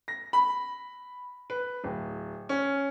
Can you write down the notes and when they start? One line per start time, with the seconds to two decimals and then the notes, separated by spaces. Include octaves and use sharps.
0.08 A#6
0.33 B5
1.50 B4
1.84 D1
2.49 C#4